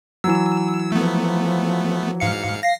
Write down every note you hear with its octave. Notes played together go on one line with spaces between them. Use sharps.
E3 F#3 E6
F3 A3 B3
G#2 F5 C#7
F5 A#6 C7